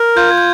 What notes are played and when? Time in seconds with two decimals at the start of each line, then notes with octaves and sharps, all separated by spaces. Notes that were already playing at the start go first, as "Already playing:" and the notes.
Already playing: A#4
0.16 F4 G6
0.31 G#6
0.38 G6